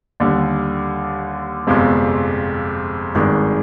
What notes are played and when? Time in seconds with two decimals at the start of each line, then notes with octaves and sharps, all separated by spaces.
0.20 D#2 D3 G3
1.67 G1 F2 C3 F3 G#3
3.15 G#1 G2 D#3 G#3